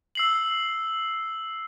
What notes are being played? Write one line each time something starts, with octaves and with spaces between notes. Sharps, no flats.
E6 C7 F#7